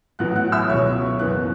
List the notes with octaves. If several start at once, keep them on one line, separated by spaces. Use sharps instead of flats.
A1 A2 F#3 B3 F#5 F#6
F#5 F#6
E5 E6
C#2 B2 F#3 C#5 C#6
F#1 F#2 E3 B3 F#6